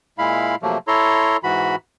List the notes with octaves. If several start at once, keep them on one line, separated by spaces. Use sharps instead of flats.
A#2 G#3 E4 F5 B5
C3 F3 F#3 A3 A#3
E4 A4 C#5 A#5 C6
G#2 E3 F#4 B5